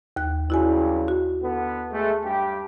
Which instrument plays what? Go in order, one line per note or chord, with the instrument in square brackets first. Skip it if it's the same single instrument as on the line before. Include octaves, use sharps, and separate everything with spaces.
[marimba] D#2 F#6
[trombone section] C#2 G2 [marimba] E4 F#4 G#5
[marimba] F#4
[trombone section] D3 B3
G#3 A3
G2 G4